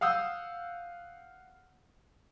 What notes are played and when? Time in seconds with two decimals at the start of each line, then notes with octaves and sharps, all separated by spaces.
0.01 F5 F#5 D#6 E6 G6